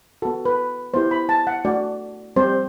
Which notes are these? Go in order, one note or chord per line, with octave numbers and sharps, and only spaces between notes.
B3 F#4 A4
B4
B3 E4 G4 C5
B5
A5
F#5
A3 D4 F#4 D5
G3 C4 G4 C5